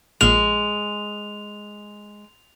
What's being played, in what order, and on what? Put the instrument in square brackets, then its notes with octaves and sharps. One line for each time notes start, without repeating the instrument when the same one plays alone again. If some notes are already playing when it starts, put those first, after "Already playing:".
[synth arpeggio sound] A#1 A#2 F6 [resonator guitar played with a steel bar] G#3 [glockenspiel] F7